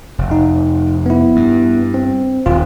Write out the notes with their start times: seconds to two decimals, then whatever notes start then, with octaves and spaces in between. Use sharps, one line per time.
0.18 F1
0.31 D#4
1.06 B3 E4
1.36 G2
1.94 C4
2.46 D#1 D#2 F4